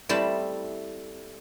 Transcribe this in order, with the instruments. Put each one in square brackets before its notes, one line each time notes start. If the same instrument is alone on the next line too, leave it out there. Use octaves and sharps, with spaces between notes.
[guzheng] G3 A3 C4 E4